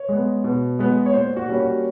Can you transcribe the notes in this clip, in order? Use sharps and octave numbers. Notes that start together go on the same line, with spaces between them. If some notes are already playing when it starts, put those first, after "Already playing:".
Already playing: C#5
G#3 B3
B2
G#3 B3
C#5
A#2 C5
F#4
G3 A#3 C#4
F#4